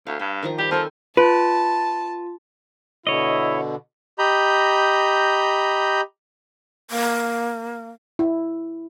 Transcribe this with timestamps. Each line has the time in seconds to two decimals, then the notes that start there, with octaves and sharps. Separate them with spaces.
0.07 D2 F5
0.19 G2 G5
0.43 D#3 F3 A#5
0.58 G3 G4
0.71 F3 C4 A4 G#5
1.17 F4 B4 A5
3.07 B2 D3 E4 C#5 D#5
4.19 G4 D#5 A#5 B5 G6
6.91 A#3
8.19 E4